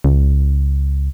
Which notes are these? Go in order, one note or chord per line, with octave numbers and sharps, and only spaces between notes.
C#2